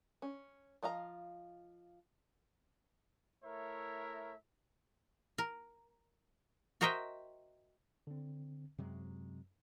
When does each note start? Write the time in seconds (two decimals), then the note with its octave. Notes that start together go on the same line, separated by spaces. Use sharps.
0.22 C#4
0.83 F3 D#5 F5 A#5
3.43 A3 E4 A#4 C#5 E5
5.38 A#4
6.81 F#4 A#4 C5 D#5 E5 G5
8.07 D3 C4
8.79 F#2 C3 F#3 G#3